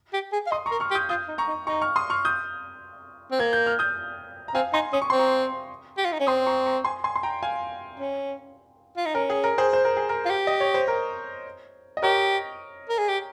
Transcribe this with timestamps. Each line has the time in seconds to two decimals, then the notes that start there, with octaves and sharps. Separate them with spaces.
0.13 G4
0.33 G#4
0.47 F5
0.51 D#5 C6 D#6
0.66 A#5 C#6
0.71 A#4
0.80 C#6 F6
0.91 G4
0.95 D#6 G6
1.09 F4 D#6 G6
1.28 D#4
1.38 A#5 C#6
1.48 D#4
1.67 D#4 A#5 C#6
1.82 C#6 F6
1.96 C6 D#6
2.10 C#6 F6
2.25 D#6 G6
3.32 C4
3.40 A#3 G#6
3.53 G6
3.66 F6
3.79 D#6 G6
4.48 A#5
4.55 C4 F5 G#5
4.73 D#4 G#5 C6
4.93 C#4 D#6
5.02 C#6
5.10 C4 C6
5.19 A#5 C#6
5.98 G4
6.05 F4
6.13 D#4
6.20 C#4
6.27 C4 C6 D#6
6.47 A#5 C#6
6.66 A#5 C#6
6.85 G#5 C6
7.04 G#5 C6
7.16 C6
7.23 G5 A#5
7.43 F5 G#5
8.00 C#4
8.97 F4
9.06 D#4
9.15 C#4 A#4
9.30 G#4
9.44 A#4
9.58 G#4 C5
9.73 C5
9.85 A#4
9.97 G#4
10.09 A#4
10.25 F4
10.30 G4
10.47 D#5
10.60 C#5
10.74 C5
10.88 A#4
11.97 D#5
12.02 G4 A#4 C#5
12.89 A#4
12.99 G#4
13.08 G4